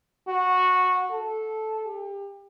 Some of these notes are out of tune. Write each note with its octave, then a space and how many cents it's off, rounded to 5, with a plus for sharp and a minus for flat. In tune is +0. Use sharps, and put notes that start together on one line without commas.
F#4 -10
A4 -10
G4 +30